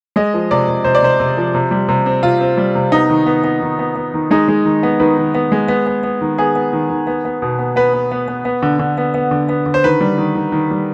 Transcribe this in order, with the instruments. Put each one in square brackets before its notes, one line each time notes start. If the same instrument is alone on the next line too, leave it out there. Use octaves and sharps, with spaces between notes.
[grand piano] G#3 D#5
F3
C3 D5
C3
C3 C5
D5
C3 C5
C3
F3
C3
G3
C3
C4
C3 F4
C4
G3
C3
B3 D#4
D#3
B3
B3
D#3
B3
B3
D#3
G#3 D#4
G#3
D#3
B3
D#3 B4
D#3
B3
G#3
B3
B3
B3
D#3
B3 G#4
B3
D#3
D#3
B3
B3
B2
B3
B3 B4
B3
B3
B3
B3
D3
D3
B3
B3
D3
B3
D3
C5
D#3 B4
G3
D#3
D#3
D#3
G3